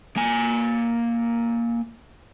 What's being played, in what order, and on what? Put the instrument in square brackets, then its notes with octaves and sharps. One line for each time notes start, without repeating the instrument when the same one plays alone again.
[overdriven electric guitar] A#3 G#5